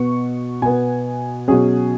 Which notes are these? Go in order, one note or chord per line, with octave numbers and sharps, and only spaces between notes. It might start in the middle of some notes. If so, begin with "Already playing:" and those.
Already playing: B2 B3 C#6
B2 B3 G#5
B2 F#3 C#4 G#4